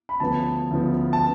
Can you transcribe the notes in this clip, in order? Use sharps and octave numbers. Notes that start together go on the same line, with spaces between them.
B5
D2 C#3 F3 B3 A5
D2 C#3 F3 B3
A5